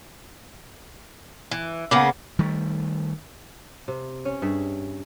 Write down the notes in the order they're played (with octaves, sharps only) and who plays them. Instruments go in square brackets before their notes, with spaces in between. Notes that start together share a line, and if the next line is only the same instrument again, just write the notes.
[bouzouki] E3
[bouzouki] C#3 A#3 B3 [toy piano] F#5 B5 D6
[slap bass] D#3 G3 A3
[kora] C3
C#4
G2 G#4 E5